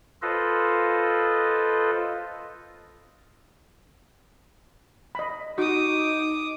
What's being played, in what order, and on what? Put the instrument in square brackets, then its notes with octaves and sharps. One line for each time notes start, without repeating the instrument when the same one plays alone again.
[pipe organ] F4 A4 B4 C5 D#5
[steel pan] D#5 B5
[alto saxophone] D#4 [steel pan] F#4 [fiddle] D6 D#6